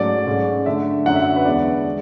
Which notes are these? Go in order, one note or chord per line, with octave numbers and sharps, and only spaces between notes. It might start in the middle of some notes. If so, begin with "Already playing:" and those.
Already playing: G#2 F#3 A3 C#4 D5
G#2 G#3 C#4
D3 A3 D4 E5
F#2 D3 F#3 F#5
E5
B4
E2 D3 G#3 B3 D4 D5
G#3